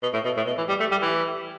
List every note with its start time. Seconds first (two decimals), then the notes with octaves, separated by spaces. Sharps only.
0.03 B2
0.13 A2
0.25 B2
0.37 A2
0.47 B2
0.58 E3
0.69 G3
0.80 A3
0.91 G3
1.02 E3